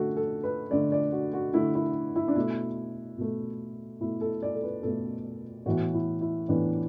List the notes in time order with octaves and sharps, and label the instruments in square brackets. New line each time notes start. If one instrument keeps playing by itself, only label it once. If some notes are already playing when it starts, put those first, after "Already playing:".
Already playing: [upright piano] D3 A3 F#4 A4
A4
B4
D3 A3 D5
D5
F#4
F#4
D3 A3 E4
E4
E4
D4
B2 A3 E4
B2 A3
B2 A3 E4
A4
D5
A4
B4
B2 A3 A4
A2 E3 B3 F#4
E4
E4
A2 E3 B3 D4